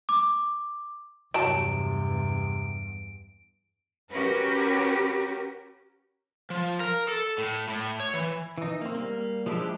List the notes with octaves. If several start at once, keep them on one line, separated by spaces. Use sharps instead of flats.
D6
E2 G2 C3 F#3 E4 A5 D7
C#4 F#4 G4 A#4 B4
F3
A#4
A4
A2
A2
C#5
E3
E3 D#4
A#3 C4
G3 A#3
F3 G#3 D4 E4 G4